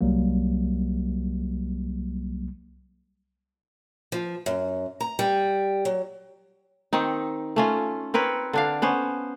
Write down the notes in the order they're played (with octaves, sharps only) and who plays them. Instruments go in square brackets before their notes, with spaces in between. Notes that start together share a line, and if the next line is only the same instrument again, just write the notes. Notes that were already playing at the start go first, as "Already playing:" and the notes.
[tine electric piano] C2 F#3 G3 A#3
[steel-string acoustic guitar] F3
F#2
A#5
G3
F#3
[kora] D#3 C4 D#4
A3 C#4 F4
C4 A#4 B4 C#5
D3 D4 F5
B3 C#4 C5